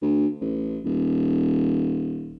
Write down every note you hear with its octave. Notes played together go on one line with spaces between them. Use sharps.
D2
A1
D#1